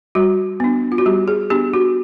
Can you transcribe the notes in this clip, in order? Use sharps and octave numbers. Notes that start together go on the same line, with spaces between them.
G3 F#4
B3 D4
F4
F#4
G3 G4
G#4
B3 D4 G4
F#4